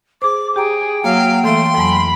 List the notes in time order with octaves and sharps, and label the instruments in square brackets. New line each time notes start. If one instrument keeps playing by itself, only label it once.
[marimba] G#4 C5 [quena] D6
[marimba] G4 A#5 [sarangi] G#4 [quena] G5
[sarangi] F#3 [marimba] A#3 [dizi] F5
[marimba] E3 E5 F5 [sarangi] A3 [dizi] C6
[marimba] F2 F#3 G#5 [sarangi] B5